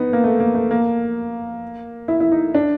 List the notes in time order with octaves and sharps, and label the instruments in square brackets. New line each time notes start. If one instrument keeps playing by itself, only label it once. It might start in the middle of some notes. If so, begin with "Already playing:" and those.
Already playing: [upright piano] B3 D#4
A#3
A3
A#3
A3
A#3
E4
E4
D#4
D4